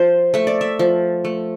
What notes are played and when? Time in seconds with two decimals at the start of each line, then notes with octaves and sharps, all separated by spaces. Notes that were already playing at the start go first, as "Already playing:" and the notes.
Already playing: F3 C5
0.34 A3 E5
0.47 D5
0.61 E5
0.79 F3
1.25 A3